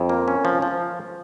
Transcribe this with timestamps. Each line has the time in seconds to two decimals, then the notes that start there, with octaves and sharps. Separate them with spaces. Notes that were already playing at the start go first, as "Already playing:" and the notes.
Already playing: F2
0.09 A#3
0.28 C#4
0.45 F3
0.62 F3